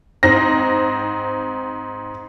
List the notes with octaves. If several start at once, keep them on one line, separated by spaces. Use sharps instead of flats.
G#2 C4 A#6